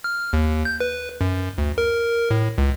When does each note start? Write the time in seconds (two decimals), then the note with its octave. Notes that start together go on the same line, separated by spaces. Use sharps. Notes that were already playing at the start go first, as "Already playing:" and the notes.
0.04 F6
0.33 D#2
0.65 G6
0.80 B4
1.21 F#2
1.58 D2
1.78 A#4
2.31 A2
2.58 C#2